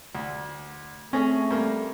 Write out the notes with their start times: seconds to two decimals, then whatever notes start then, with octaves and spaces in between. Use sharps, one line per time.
0.15 D2
1.13 A3 C4 C#4 G#4 C#5 G#5 A#6
1.51 G2 A#3